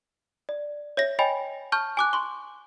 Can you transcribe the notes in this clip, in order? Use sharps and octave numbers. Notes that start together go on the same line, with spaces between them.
D5
C#5 E5 A#6
C#5 D#5 G5 G#5 B5
A5 C#6 F6 G6
G#5 D6 F#6
C6 C#6